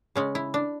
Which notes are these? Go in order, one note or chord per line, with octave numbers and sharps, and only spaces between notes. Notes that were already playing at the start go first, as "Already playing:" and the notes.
C#3 G#3 C#4
E4
D4